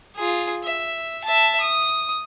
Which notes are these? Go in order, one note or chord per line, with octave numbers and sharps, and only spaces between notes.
F4 G#4
E5
E5 A5
D#6